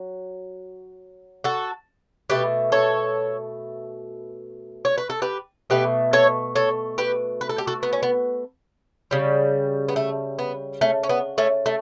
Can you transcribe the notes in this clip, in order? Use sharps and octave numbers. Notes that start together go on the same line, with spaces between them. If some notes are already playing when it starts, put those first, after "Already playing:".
Already playing: F#3
F#4 A4
B2 A3 G4 B4
A4 C#5
C#5
B4
A4
G4 B4
B2 A3 G4 B4
A4 C#5
A4 C#5
G4 B4
B4
A4
G4
F#4 A4
B3
C#4
B3
C#3 G3
B3
A3
B3
A3 C#4
C#4
B3
A3 C#4
A3